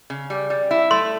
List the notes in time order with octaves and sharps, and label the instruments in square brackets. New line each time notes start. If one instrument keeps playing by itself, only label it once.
[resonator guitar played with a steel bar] C#3
G3
G3
E4
[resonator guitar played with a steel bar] A3 [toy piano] C6